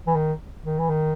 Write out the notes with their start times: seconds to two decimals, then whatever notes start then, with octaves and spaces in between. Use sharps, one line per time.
0.07 E3
0.15 D#3
0.64 D#3
0.79 E3
0.89 D#3